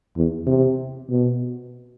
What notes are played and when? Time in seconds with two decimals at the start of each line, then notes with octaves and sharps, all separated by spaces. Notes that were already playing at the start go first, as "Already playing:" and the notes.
0.17 E2
0.47 C3
1.10 B2